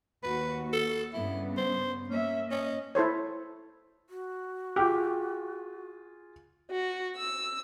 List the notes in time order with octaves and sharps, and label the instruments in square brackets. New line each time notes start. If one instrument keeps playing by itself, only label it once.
[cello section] D#2 F#4 [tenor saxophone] B4
[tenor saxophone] A4
[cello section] G2 C#3 B3 [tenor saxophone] E4
[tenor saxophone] C5
[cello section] A#3 E5 [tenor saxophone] C#4
[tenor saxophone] C#4 [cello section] D#5
[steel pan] E4 A4 C5 C#5
[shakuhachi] F#4
[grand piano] F4 G#4 [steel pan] G4
[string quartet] F#4
E6